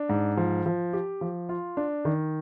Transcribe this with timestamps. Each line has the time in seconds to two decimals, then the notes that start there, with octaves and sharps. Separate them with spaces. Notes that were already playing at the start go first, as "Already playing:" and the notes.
Already playing: D4
0.09 G#2
0.37 F3
0.66 F3
0.93 G4
1.21 F3
1.49 F4
1.77 D4
2.05 D#3